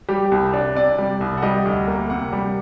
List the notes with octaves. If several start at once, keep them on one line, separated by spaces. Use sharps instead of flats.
G3 G4
C2
D4
C3 D5
G3
C2
F#5
G3 D#5
D2
A#3
C3 F#5
G3